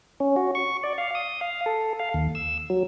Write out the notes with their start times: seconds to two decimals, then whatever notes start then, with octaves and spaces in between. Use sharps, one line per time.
0.20 C#4
0.36 F#4
0.55 C#6
0.83 D5
0.98 F5
1.15 D#6
1.41 F5
1.66 A4
1.99 F5
2.14 D#2
2.35 E6
2.70 F#3